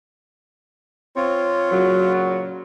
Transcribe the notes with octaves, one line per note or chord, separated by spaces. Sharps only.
C4 F4 C#5
A#2 C#3 F#3